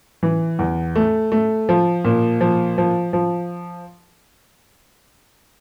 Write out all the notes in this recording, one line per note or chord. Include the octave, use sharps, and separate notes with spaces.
E3
E2
A3
A3
F3
A#2
F3
F3
F3